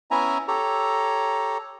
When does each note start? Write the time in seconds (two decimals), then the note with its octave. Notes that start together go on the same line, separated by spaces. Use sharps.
0.11 B3 C#4 E4 E5 G#5 A#5
0.48 G4 A4 C#5 A#5